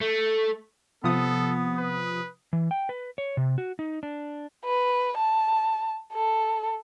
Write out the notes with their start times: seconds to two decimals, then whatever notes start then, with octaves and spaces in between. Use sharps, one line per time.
0.01 A3
1.04 C3 F3 B3 A4 D#6
1.78 B4
2.53 E3
2.71 G5
2.89 B4
3.18 C#5
3.37 C3
3.58 F#4
3.79 D#4
4.03 D4
4.65 B4
5.17 A5
6.13 A4